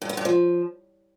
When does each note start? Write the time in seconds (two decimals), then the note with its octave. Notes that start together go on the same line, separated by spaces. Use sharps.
0.02 G2
0.09 B3
0.17 G2
0.25 F3